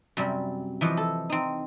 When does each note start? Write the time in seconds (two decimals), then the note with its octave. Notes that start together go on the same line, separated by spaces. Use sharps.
0.17 F#2 C3 G3
0.81 E3 F3 D#5
0.97 A4
1.30 C4 D#4